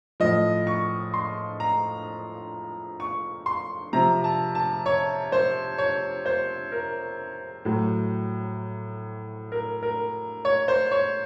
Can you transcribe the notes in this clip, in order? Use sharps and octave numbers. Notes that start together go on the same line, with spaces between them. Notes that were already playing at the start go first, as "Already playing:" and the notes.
A2 F3 D#5
C#6
C6
A#5
C#6
C6
C3 F3 A#5
A5
A5
C#5
C5
C#5
C5
A#4
A2 F#3
A#4
A#4
C#5
C5
C#5